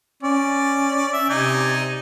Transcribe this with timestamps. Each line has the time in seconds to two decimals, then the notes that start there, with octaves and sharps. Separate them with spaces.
0.23 C#4 D5
1.13 E5
1.30 C3 D#4 D5 G#5